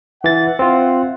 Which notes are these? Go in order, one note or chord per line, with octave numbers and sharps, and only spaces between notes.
E3 E5 F#5 A6
C4 F4